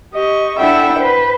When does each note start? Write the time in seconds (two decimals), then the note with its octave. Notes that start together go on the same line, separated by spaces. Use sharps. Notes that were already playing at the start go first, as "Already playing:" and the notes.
0.13 G4 D#5 C#6
0.58 D4 E4 A4 E5 F#5 G5
0.99 B4 C5